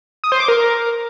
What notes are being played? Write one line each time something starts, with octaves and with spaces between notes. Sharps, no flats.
D#6
C5
D6
A#4